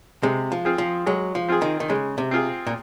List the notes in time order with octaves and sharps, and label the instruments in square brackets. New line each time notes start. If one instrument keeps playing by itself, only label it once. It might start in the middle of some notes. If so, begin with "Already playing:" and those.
[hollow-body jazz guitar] C3 [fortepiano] G#3
[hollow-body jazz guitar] F3
[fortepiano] C4 F4 G#4
[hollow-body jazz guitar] F3
[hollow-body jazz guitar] F#3 [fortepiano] G#3
[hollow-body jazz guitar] F3
[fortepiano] C4 F4 G#4
[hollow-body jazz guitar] D#3
D#3
[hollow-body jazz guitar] C#3 [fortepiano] G#3
[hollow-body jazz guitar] C3
[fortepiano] C4 F4 G#4
[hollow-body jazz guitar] A#2